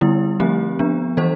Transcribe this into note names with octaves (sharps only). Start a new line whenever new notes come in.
D3 G3 B3 E4
F3 A3 C4 G4
F3 B3 D4
E3 G3 D4 A4 C5